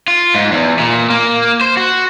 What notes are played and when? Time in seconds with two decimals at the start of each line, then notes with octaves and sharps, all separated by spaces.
0.08 F4
0.35 G#2
0.52 E2
0.80 A#2
1.10 A#3
1.61 C5
1.77 F#4